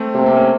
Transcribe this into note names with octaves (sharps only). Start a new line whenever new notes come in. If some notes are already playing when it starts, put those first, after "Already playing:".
Already playing: A3 C4
C3 A#3
A#3
A#3 C#4